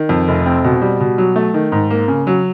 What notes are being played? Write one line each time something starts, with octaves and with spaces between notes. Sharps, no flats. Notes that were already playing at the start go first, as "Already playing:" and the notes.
Already playing: D#3
F2
F1
C4
B2
G3
B2
F#3
A3
D#3
G#2
A#3
C#3
F#3